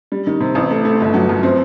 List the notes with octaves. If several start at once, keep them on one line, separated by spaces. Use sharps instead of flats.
G3
D#3
C3
A1
A3
A3
G1
F#3
F#2
C4